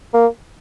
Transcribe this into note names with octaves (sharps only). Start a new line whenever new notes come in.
A#3